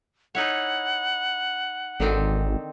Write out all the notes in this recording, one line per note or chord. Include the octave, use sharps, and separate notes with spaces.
D#4 E4 C#5 F#5
G#1 D3 D#3 C4